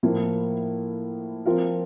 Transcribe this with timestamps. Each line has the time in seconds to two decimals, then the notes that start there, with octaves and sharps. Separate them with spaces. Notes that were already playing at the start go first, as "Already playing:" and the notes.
0.03 A2 F3 A#3 E4
1.46 F3 C4 F4 A#4